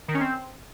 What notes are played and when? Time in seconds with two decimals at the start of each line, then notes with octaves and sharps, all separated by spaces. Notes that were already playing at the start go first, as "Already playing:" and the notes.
0.08 D#3
0.14 C#4
0.20 C4